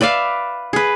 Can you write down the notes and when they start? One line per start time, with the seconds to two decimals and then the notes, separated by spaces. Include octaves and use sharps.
0.01 B4 D5 E5 F5
0.73 G#4 B4